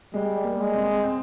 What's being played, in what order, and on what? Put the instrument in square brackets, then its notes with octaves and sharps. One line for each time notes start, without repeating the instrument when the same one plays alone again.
[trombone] G3 [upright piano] G#3
[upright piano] A#3
[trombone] G#3
[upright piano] C4
C4